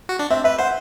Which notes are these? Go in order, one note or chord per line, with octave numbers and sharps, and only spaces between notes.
F#4
D4
C4 E5
B4 E5
C5 F#5